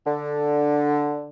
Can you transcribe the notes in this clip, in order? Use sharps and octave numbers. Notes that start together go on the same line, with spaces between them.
D3